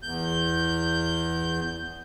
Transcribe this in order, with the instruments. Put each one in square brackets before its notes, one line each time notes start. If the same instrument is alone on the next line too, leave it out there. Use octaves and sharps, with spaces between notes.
[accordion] E2 G6